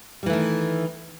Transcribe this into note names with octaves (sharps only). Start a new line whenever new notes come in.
D#3 E3 G3 A3